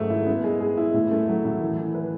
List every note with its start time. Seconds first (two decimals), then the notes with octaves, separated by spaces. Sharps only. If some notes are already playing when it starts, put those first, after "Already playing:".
Already playing: G#2 F#3 A3
0.10 E4
0.27 B3
0.44 G#3
0.60 G#4
0.77 E4
0.94 A2
1.11 A3
1.28 F#3
1.45 A2
1.61 E3
1.79 E3
1.95 B4